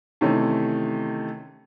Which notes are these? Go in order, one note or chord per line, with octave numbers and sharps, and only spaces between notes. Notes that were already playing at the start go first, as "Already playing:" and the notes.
C3 D#3 E3 A3 C#4